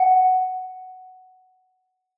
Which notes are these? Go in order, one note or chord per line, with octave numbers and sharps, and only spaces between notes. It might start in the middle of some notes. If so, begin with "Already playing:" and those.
Already playing: F#5